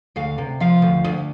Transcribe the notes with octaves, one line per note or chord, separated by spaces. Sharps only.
D2 F5
C3
F3 F5
D2
D2